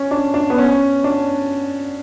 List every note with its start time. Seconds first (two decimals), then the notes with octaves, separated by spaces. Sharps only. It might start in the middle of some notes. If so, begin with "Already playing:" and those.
Already playing: C#4
0.11 D4
0.34 D4
0.50 B3
0.58 C#4
1.04 D4